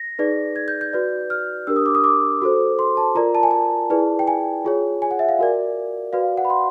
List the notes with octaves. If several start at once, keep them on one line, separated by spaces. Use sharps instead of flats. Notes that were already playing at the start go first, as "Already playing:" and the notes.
Already playing: A#6
D#4 G#4 B4 D5
G#6
G6
G6
F#4 B4 D5
F6
D4 G4 A#4 E6
D#6
D6
D#6
D6
F#4 A4 C5
C6
A5
F4 A#4 D5 A#5
A5
G#5
A5
E4 G#4 B4 D5
G5
G#5
F4 G#4 C#5
G#5
F#5
E5
F5
F#4 A#4 D5
F#4 B4 D5 F5
F#5
B5
C6